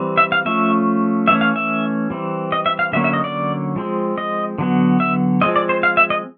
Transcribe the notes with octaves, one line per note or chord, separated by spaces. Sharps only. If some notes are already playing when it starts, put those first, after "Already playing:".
Already playing: E3 G3 C4
E5
F5
F3 A3 C#4 E5
E3 A3 C#4 E5
F5
E5
E3 G3 C4
D#5
E5
F5
D3 F#3 A#3 C#4 E5
E5
D#5
D5
F3 G#3 C4
D#5
D3 F#3 B3
E5
F3 G#3 C4 D#5
D5
C5
F5
E5
D#5